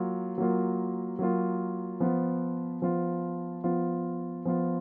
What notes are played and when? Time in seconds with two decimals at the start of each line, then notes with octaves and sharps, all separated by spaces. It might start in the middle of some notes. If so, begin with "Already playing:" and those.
Already playing: F#3 A#3 F4
0.38 F#3 A#3 F4
1.19 F#3 A#3 F4
2.00 F3 B3 F4
2.82 F3 B3 F4
3.64 F3 B3 F4
4.45 F3 B3 F4